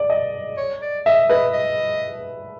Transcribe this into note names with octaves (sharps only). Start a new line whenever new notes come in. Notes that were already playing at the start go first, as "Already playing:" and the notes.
Already playing: D5
D#5
C#5
D5
D#5 E5
B4 D#5
D#5